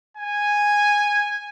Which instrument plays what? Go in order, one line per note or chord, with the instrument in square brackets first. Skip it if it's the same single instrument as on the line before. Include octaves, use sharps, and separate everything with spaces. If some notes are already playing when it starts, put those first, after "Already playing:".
[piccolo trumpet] G#5